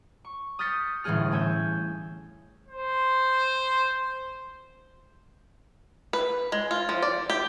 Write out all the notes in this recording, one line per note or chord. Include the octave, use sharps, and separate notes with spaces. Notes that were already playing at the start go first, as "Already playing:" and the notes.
C#6
D#6 F6 G6 A6 B6 C#7
G1 A2 E3 C#4 G#4 F6
A3 C#4 G#5 E6 G6
C5
B4
G#3
F4
F3
D5
G4